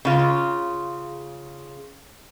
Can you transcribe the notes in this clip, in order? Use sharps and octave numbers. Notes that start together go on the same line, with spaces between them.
C#3 F4